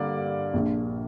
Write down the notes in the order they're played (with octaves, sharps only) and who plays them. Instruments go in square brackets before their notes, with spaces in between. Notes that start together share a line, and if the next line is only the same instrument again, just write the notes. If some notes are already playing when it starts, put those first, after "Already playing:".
Already playing: [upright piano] G2 D3 A#3 D5
A#1 A#2 A#3 D4